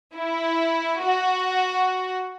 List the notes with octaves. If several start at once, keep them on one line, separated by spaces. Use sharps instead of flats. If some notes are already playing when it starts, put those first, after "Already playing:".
E4
F#4